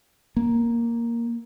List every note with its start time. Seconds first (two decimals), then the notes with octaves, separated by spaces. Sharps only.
0.37 A#3